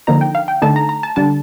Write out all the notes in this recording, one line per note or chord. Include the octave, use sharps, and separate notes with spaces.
D3 F3 A#3 D#4 A#5
G5
F5
G5
D3 A3 D#4 A5
A#5
A#5
A5
D3 G3 D4 A5